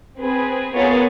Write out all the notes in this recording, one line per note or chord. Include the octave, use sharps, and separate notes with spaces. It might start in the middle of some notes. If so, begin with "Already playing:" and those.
C4 G#4 B4
B3 F4 G#4 A#4 C#5 A6